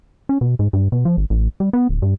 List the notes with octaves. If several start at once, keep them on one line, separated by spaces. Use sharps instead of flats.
C#4
B2
G#2
G2
B2
F3
G#1
A1
G3
B3
D1
G2